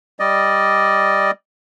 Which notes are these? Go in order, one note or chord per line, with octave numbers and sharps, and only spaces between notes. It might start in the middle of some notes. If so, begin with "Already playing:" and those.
G3 D5 D#5